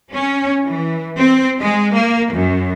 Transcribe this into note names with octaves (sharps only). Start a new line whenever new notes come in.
C#4
E3
C4
G#3
A#3
F#2